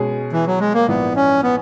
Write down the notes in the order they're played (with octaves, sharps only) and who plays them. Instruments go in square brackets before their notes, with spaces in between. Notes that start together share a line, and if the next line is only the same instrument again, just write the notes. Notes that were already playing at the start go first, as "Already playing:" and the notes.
Already playing: [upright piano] B2 G#3 C#4 G#4
[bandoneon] E3
F#3
G#3
A#3
[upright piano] A#1 G#2 E3 [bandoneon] B3
[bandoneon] C#4
B3